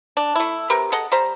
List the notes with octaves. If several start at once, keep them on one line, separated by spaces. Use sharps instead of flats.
D4
A3 E4
C3 G4 A#4 B4
G#4 A4 D#5 F#5
G3 C5 A#5